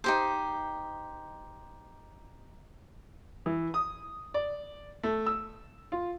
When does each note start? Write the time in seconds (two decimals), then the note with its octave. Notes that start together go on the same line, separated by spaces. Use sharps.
0.04 D#4 G4 C5
3.46 E3
3.74 D#6
4.34 D5
5.03 A3
5.26 E6
5.92 F4